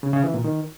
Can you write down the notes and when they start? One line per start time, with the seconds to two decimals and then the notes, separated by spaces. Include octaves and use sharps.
0.03 C#3
0.13 C#3
0.24 E3
0.34 A#2
0.44 D#3